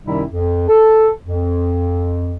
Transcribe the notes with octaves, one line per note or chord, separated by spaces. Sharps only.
F#2 C3 D#3 G3 D#4 E4
F2
A4
F2